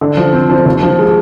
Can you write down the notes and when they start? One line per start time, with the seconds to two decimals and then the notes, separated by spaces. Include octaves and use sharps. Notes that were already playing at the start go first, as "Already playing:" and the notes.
0.01 D3
0.17 F3
0.33 C4
0.50 F3
0.66 D#2
0.83 F3
0.99 G#3